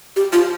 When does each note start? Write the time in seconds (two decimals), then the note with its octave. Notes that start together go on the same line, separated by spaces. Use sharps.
0.16 G4
0.33 F4